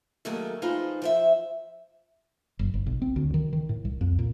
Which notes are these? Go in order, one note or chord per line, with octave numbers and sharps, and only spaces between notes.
D#3 F#3 A3 A#3 G#4 A4
F3 D#4 F4 G#4 B4 C5
F3 C5 E5
F#1
G1
B1
C4
D2
D#3
D#3
A2
C2
F2
A#2